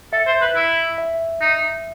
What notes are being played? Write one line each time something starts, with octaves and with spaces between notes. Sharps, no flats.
A4 E5
C5
B4
E4
E5
D#4